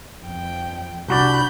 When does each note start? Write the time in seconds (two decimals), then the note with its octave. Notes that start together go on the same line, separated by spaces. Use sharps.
0.25 F2 G5
1.08 C2 D4 F#4 D5 B5 G6